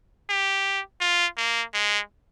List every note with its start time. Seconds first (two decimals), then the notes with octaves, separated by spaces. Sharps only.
0.30 G4
1.01 F4
1.37 A#3
1.74 G#3